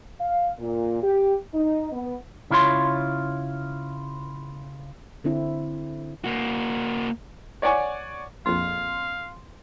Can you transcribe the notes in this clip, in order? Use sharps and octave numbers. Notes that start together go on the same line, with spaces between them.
F5
A#2
G4
D#4
B3
C#3 E4 F4 C#5 C6
D3 C4 E4
A#3 F#4
C#5 D5 F#5 G#5 C#6
A#1 F2 F5 C6